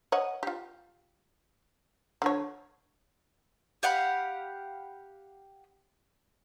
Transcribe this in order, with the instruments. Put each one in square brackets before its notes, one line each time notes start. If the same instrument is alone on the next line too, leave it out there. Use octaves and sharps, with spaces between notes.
[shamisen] C#5 D#5 F#5
F4 G4
D3 F3 C#5
[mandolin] G4 F5 F#5 B5